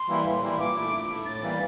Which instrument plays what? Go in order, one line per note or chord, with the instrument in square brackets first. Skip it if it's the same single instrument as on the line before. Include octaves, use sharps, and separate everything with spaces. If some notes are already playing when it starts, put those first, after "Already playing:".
Already playing: [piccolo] C6
[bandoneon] E3 G3 A#3 E4
A2
E3 G3 A#3 E4
[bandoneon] A#2 [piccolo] D6
[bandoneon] A3 E4
A#2
A3 E4
[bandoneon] A2 [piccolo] A6
[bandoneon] E3 G3 A#3